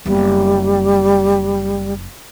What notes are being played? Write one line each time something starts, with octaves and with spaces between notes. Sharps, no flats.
F#1 G3 B3